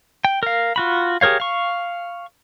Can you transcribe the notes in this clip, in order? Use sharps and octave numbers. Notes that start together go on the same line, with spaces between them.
G5
A#4 F5
F4 F#4 B5
G4 G#4 A#4 C#5 F5
F5 C#6